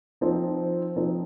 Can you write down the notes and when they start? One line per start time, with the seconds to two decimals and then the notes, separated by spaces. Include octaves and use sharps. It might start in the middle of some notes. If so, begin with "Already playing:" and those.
0.21 F3 C4 D#4
0.96 F3 C4 D#4